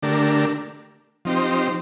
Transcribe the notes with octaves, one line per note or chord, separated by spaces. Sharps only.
D3 A3 D4 G4 A#4
F3 C4 D#4 G4 C5